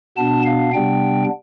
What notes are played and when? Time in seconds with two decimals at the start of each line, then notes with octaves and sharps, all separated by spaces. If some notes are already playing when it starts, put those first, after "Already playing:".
0.17 B2 B3 D4 A5
0.45 F5
0.73 C3 G3 B3 D4 G5